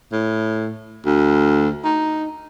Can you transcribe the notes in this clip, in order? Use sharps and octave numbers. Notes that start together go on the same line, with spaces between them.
A2
D2
D#4